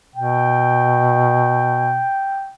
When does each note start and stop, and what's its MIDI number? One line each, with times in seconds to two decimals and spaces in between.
0.16 2.06 47
0.16 2.54 79